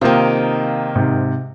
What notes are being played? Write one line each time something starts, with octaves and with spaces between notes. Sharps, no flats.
C3 D#3 A#3 D#4 F4 C5
G#2 C3